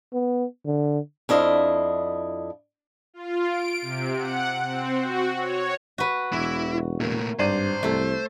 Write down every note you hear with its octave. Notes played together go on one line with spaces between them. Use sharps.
B3
D3
F2 D4 E4 D#5 F5
F4
D7
C3
F#5
C4
F#4
C#5
F#4 B4
E1 E3 E4
A#2 A3 A#3
G#1 G2 C5 D5 D#7
C2 A3 A4